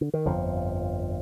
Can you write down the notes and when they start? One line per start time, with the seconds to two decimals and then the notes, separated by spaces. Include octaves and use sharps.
0.01 D3
0.14 D#3
0.25 G1 F2 D3 F3